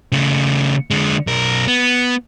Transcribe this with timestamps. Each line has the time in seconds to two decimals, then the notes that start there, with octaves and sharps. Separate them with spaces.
0.12 C#3 A3
0.91 D3 G#3
1.27 B1 A#4
1.68 B3